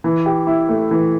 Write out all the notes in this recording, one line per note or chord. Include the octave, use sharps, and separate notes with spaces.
E3
G4
E4
A3
E3